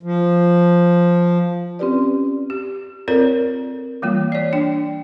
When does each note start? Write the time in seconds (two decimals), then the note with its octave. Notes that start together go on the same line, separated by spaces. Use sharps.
0.03 F3
1.79 C4 C#4 F4 G4 B4 D5
2.50 G4
3.08 C4 F4 A4 A#4 C#5 D5
4.02 E3 G3 A#3 F4
4.32 C#5 D5
4.53 D4 G5